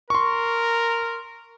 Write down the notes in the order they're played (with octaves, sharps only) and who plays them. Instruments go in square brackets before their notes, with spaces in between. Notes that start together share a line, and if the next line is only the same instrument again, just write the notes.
[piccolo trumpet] A#4 [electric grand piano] C6 C#6